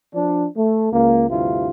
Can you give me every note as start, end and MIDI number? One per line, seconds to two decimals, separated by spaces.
0.14 0.45 53
0.14 0.45 62
0.57 0.89 57
0.91 1.24 37
0.91 1.24 58
1.29 1.70 38
1.29 1.70 43
1.29 1.70 48
1.29 1.70 64
1.29 1.70 65